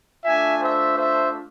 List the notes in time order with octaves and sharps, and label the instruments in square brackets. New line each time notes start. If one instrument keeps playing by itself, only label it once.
[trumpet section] A3 D4 F4 E5 G#5
C5 E5
C5 E5